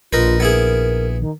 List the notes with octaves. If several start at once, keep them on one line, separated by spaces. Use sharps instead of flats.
A#1 D#4 F4 A#4 B4
B3 E4 G#4 A#4
D#3